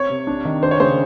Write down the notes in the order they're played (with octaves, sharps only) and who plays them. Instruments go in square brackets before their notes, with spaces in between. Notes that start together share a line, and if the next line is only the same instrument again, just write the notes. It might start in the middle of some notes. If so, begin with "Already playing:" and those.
Already playing: [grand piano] C4 [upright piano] C#5
[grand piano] C3
D4
D#3
[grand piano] D4 [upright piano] C5
[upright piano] C#5
[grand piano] C#3 [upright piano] C5